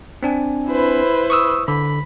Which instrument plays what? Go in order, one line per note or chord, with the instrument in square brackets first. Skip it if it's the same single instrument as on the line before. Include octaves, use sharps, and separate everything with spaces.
[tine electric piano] C4 D4 G#5
[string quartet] E4 B4 C5
[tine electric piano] C#6 D#6 E6
[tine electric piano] D3 [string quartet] B5